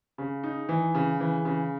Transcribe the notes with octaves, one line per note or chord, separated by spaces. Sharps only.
C#3
D#4
E3
C#3
E3
C#3